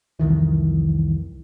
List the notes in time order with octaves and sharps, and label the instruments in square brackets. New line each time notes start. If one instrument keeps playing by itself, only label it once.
[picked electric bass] C2 F2 D#3 E3